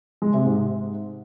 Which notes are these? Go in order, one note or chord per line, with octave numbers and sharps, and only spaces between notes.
G#3
C3
G#2